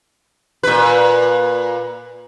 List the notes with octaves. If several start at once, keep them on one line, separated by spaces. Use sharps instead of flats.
A#2 B4